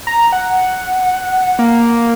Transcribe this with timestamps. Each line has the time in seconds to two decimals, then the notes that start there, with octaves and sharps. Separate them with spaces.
0.07 A#5
0.32 F#5
1.59 A#3